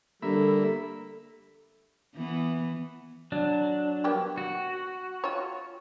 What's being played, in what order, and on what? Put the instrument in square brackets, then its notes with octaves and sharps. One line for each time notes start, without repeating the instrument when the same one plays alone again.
[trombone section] D3 G3 [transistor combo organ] A#3 E5 B5 [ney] A4
[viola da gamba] E3 B3
[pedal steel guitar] F#3 D4
[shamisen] A#3 B3 G4
[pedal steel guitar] F#4
[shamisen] F4 C#5